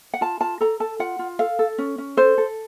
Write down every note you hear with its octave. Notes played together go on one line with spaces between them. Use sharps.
F#5
F4 A5
F4 A5
A4 A#5
A4 A5
F4 F#5
F4
A4 F5
A4
C#4
C#4
A4 C5
A4